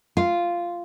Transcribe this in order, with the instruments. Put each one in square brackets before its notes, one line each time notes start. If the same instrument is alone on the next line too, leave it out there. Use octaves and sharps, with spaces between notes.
[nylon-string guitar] F4